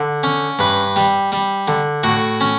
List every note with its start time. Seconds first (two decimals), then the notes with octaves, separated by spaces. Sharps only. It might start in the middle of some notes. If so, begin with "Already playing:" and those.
Already playing: D3
0.23 C#4
0.59 G2 B4
0.96 G3
1.32 G3
1.68 D3
2.03 A2 F#4
2.41 C#4